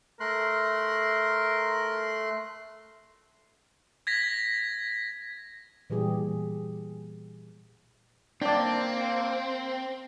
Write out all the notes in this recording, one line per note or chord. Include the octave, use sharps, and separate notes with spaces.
A3 A#4 C6 F#6
G#6 A#6 B6
A#2 E3 G3 G4 G#4
A#3 C4 D4 D5